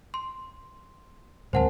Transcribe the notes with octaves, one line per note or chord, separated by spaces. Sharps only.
C6
D1 G#3 C4 A#4 C5 F#5 A5